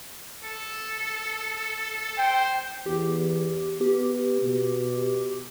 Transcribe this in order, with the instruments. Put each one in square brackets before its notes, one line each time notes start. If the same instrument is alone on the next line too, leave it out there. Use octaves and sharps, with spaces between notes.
[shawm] A4
[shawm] C5 [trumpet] G5
[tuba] E2 [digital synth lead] G4
[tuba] B3 [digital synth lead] G4
[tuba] B2